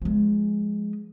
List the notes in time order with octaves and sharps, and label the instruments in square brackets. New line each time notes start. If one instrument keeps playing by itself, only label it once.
[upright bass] F3 G#3